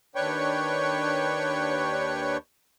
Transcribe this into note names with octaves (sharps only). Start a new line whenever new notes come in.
D#2 D4 B4 C#5 G5 C#6